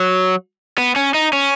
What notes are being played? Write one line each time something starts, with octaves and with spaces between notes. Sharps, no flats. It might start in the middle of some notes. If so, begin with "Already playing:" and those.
Already playing: F#3
B3
C#4
D#4
C#4